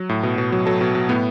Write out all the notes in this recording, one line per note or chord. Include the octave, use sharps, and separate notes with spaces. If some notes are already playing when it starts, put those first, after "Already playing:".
Already playing: F#3
A2
B2
B2
F#3
F#3 A4
B2
B2
A2 B3